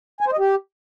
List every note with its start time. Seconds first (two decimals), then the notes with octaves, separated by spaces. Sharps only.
0.21 G#5
0.27 C5
0.33 D#5
0.39 G4